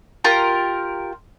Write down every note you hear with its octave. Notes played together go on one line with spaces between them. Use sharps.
F4 G4 A#4 A#5